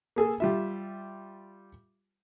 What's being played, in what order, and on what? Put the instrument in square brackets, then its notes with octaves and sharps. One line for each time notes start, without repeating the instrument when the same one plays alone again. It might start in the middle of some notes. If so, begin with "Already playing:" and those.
[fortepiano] A#3 G#4 A4
G3 F4 E5